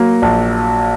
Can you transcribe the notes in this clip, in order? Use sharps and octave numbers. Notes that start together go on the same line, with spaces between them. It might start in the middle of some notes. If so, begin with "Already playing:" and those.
Already playing: F#3 A#3
A#1